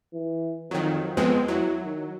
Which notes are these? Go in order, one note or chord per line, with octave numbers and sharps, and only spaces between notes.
E3
F2 D#3 F#3
F2 G#3 B3 C4
F#3 E4
D#3